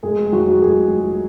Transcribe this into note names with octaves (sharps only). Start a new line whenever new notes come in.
F1 G#3 G#4
D#3 F#3 F#4
F1 G#3 G#4
F2